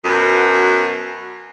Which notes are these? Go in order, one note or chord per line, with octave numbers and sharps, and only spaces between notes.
F#2 B2